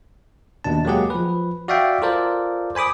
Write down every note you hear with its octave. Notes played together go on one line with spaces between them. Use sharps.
D#2 B2 D4 A5
F#3 G#3 A#3 G4 G#4 F#5
F3 B4
F#4 D5 E5 F5 G5
F4 A4 A#4 C5 D5
C5 G#5 B5 D6 D#6